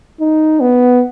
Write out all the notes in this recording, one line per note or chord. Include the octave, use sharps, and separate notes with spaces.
D#4
B3